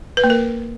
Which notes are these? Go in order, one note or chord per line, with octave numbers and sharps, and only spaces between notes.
B4
A#3
A#4